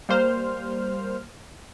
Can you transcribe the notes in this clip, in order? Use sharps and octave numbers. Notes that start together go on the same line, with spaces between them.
G3 A#3 C5 F6